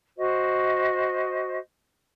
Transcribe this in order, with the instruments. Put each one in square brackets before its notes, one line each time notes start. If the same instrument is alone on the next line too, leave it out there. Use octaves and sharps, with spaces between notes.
[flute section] F#4 C5 D#5